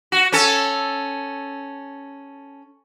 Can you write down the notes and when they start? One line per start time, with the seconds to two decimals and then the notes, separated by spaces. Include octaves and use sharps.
0.12 F#4
0.32 C#4 A4